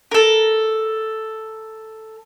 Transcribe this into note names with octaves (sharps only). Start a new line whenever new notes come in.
A4 A#4